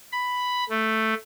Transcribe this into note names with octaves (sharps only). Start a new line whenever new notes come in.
B5
A3